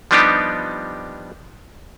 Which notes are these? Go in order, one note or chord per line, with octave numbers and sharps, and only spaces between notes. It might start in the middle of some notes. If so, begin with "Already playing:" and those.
F3 G3 B3 D4 D#4 G4